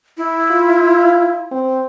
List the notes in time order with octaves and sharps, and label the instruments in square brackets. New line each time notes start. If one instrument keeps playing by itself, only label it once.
[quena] E4
[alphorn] F4
C4